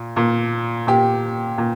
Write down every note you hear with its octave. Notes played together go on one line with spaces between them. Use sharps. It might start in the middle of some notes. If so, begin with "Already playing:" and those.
Already playing: A#2
A#2
A#2 G4
A#2